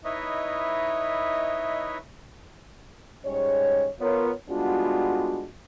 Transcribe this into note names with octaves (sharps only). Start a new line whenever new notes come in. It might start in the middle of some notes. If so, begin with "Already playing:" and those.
D#4 E4 B4 C#5 D#5 E5
G#2 G3 G#3 C#4 C#5
B3 F4 A#4 C#5
G3 G#3 B3 D4 F4 F#4